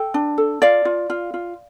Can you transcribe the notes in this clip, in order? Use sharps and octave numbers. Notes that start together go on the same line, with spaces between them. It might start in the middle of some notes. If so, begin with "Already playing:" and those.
Already playing: A4 G5
D4
A4
F4 D5 F5
F4
F4
F4